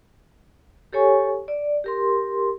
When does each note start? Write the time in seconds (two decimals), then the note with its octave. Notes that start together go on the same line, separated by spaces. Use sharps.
0.93 G4 A4 C#5 G#5 C#6
1.48 D5
1.84 G4 A#4 C6